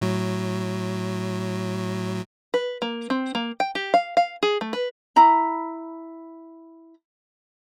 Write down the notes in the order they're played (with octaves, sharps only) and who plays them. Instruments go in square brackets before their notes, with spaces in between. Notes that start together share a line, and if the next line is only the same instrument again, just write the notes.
[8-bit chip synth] A2 F#3
[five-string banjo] B4
A#3
C4
A#3
G5
G4
F5
F5
G#4
A3
B4
[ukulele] E4 A#5 B5